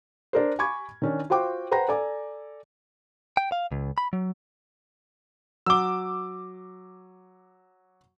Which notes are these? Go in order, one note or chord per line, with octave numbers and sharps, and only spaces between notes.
D4 A#4 C5
G#5 B5 C#6 D6 G#6
D#3 C#4 D4
F4 F#4 C5 G5 D6
B4 C5 F#5 G5 A#5 A#6
A4 D5 G#5 A#5 D6
G5
F5
C#2
B5
F#3
F#3 D6 E6 G7